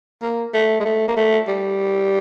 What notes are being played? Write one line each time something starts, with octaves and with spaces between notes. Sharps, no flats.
A#3
A3
G#3
A3
A#3
A3
G3